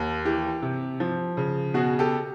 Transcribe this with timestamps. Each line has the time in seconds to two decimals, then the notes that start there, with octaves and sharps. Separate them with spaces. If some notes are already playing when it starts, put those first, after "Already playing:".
Already playing: D#2
0.25 E3 G4
0.62 C3
1.00 F3
1.37 C#3
1.74 B2 F#4 G#4
1.99 G4 A4